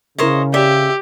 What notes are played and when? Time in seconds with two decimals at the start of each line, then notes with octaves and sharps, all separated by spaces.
0.18 C#3 E4 A#4 C5 C#5 D#5 E5
0.54 G4 D5 E5